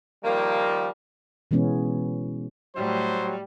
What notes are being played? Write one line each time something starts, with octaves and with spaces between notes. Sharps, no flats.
D#3 F3 G3 A#3
B2 E3 G#3 B3 C#4
A2 F#3 G3 C5